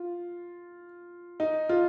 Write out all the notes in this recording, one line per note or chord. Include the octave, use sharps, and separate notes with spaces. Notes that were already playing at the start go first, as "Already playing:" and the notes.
Already playing: F4
D#4
F4